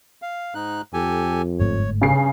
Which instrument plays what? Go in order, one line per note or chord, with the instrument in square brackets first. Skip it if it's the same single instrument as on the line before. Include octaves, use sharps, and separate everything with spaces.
[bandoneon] F5
G#2 D#4 F#6
[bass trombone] F2 [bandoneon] G4 A4 G#5
[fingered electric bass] G1 G#2 A3 [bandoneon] C#5
[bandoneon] G2 [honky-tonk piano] C#3 C7